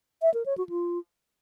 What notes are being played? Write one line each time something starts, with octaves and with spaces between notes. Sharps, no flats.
E5
A#4
C#5
F#4
F4